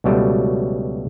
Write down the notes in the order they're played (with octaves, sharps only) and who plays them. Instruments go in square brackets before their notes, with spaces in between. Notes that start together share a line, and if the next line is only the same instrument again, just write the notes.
[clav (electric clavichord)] C#2 B2 F#3 G3 A3